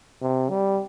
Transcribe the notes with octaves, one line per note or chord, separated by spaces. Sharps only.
C3
G3